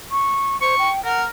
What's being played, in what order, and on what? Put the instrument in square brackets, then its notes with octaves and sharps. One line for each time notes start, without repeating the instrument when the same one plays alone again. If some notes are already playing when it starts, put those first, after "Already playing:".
[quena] C#6
[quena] C5 [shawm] C#6
[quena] G5
[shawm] A#4 [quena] F#5